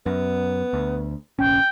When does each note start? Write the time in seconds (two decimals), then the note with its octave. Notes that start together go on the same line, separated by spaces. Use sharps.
0.06 F#2 B3
0.73 D2
1.39 F1 A#1 C#4 G5